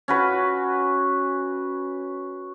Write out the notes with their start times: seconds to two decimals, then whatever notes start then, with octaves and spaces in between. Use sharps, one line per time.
0.08 C#4 F#4 B4